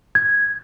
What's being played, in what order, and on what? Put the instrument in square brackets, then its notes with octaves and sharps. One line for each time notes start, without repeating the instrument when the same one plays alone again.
[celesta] G#6